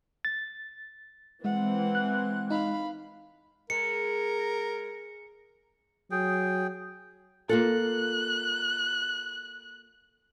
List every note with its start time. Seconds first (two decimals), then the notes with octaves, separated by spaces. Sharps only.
0.25 A6
1.45 E3 G#3 C4 F#5
1.95 F#6
2.50 D#4 F5 B5
3.70 G#3 A#4 C#7
6.11 F#3 G#4 G5
7.49 A#3 F4 A4 F#6